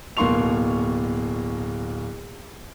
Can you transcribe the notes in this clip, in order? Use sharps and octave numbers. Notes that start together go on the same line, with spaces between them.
D1 B2 A#3 C6 C#6 F7